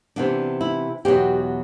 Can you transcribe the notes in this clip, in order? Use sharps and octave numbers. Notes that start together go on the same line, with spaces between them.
C3 E3 B3 D4
E4
E2 B2 F#3 G4